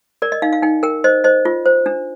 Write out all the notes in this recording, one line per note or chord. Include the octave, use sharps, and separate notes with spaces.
A#4 D5
D#5
D#4 F5
F5
D#4 G5
A#4 G5
C5 D#5
C5 D#5
F4
C5
D4